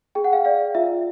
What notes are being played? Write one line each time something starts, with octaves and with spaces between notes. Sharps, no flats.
G#4 G5
F#5
F5 G5
D5 F5
F4 E5